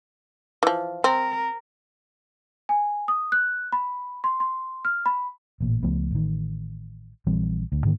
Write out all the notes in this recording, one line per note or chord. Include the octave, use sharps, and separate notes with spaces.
E3 F3
C4 A#4
G#5
D#6
F#6
B5
C6
C6
F6
B5
A1 A#2
C#2 F3 A3 B3
A1 D#3
A#1 E3 G3 C4
D2
G#2 D3 D#3 A#3